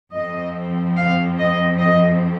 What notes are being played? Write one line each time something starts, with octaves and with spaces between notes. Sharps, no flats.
F2 F3 C4 D#5
F5
D#5
D#5